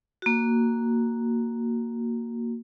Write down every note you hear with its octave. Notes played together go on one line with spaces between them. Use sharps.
A#3 F#4